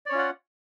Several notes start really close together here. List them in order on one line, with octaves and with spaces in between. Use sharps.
D5 C#5 C#4 F4 F#5